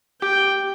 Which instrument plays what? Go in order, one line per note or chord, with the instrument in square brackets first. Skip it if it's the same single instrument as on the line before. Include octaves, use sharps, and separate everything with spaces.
[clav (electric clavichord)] G4 [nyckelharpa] G5